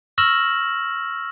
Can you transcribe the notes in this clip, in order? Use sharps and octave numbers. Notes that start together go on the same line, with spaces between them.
C#6 E6 F6 A#6 E7 F#7